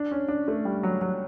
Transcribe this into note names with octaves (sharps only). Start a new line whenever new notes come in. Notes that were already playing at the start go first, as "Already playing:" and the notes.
Already playing: D4
C#4
D4
A3
G3
F#3
F#3